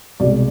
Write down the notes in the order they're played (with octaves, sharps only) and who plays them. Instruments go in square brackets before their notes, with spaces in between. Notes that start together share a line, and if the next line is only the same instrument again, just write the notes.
[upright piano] C2 B2 G#3 D5